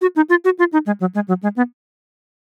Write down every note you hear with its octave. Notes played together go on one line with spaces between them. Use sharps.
F#4
D#4
F4
F#4
F4
D#4
G#3
F#3
G#3
F#3
G#3
B3